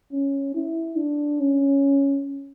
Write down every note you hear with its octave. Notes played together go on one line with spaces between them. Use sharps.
C#4
E4
D4
C#4